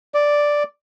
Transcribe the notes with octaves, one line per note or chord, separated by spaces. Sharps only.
D5